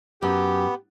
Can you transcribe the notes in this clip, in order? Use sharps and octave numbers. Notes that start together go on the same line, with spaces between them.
F#2 B3 G4